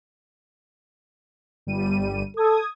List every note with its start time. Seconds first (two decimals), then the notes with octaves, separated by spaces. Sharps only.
1.67 G1 G3 D#7
2.37 A4 D#6 G#6